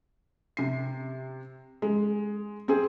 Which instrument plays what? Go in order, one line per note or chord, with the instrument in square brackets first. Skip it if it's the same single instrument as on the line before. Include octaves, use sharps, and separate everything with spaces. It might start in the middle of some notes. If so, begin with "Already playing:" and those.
[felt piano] C3 C7
G#3
C4 G#4